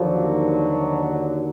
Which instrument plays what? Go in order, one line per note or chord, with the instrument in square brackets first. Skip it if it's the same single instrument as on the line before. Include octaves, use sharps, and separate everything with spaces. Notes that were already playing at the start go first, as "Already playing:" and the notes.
Already playing: [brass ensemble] D#2 D3 F#3 [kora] F3